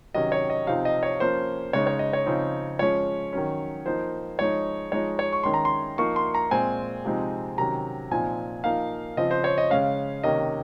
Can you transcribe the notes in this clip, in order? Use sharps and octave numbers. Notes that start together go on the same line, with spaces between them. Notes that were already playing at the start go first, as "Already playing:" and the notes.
C3 D#3 F#3 C#4 D#5
C#5
D#5
C3 F3 C4 D#4 F5
D#5
C#5
F3 A#3 C#4 C5
C#3 G#3 D#4 C#5
C#5
D#5
C#5
C#3 F3 C4 D#4
F3 G#3 C#4 C#5
D#3 F#3 C#4
F3 A#3 D#4 C5
F3 G#3 D#4 C#5
F3 G#3 D#4 C#5
C#5
C#6
D#3 G#3 C#4 C6
A#5
C6
F3 A#3 D#4 C#6
C6
A#5
A#2 G#3 C4 G#5
C3 F3 G#3 C4 D#4
C3 D#3 F#3 C#4 A#5
A#2 F3 C4 D#4 G#5
F3 A#3 D#4 F5
C#3 F3 C4 D#5
C5
C#5
D#5
C#3 G#3 C#4 F5
C3 D#3 A#3 C#4 D#5